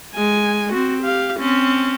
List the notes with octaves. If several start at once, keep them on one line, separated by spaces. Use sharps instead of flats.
G#3 G#5
C4 F#4
G4 F5
C4 C#4